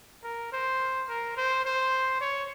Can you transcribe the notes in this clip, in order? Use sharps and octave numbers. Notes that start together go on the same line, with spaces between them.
A#4
C5
A#4
C5
C5
C#5